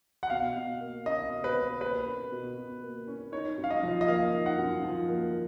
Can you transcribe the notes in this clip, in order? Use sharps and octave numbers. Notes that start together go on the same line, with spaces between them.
F#5
B2 F5
B2
A#3
C#4 D#5
B2
B4
B2
A#3 B4
C#4
B2
B2
A#3
C#4
D#4 C#5
F#2
F5
D#5
F3
D#5
A#3 F5
D#4
F#5
F#2
F3
A#3